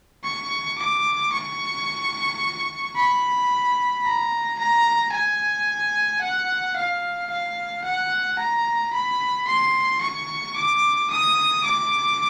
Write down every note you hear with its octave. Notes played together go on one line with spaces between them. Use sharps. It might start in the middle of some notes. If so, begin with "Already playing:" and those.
C#6
D6
C#6
B5
A#5
A#5
G#5
F#5
F5
F5
F#5
A#5
B5
C6
C#6
D6
D#6
D6